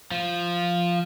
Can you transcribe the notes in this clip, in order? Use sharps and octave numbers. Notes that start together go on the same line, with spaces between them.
F3